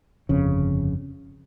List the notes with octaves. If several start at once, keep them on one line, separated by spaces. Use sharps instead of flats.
G1 F2 C#3